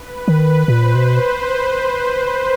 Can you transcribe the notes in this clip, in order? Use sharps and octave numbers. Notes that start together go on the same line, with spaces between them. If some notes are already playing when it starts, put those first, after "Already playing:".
Already playing: B4
D#3
A#2 C5
B2